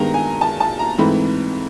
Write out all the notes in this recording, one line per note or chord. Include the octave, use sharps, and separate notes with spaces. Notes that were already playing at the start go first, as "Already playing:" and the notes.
Already playing: G2 D#3 G#3 B3 A#5
G#5
A5
A5
A#5
G#2 E3 A3 C4 B5